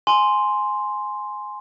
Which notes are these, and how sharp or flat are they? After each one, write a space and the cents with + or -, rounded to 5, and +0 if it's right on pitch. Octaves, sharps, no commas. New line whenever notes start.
G#5 +5 C6 +0